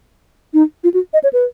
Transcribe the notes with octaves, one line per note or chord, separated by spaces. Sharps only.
D#4
F4
F#4
D#5
C#5
B4